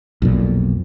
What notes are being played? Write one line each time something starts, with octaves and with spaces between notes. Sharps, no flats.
B1 F2 A#2